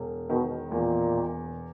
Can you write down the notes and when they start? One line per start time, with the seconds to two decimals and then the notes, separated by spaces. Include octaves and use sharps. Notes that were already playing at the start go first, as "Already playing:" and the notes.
Already playing: E1
0.29 B2 D#3
0.71 E2 A#2
1.13 E1